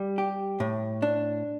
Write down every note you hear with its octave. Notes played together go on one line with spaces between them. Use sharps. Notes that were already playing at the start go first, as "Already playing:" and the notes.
Already playing: G3
G4
A2
D4